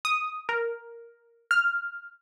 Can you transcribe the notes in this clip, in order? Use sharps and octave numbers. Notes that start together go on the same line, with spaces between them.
D#6
A#4
F6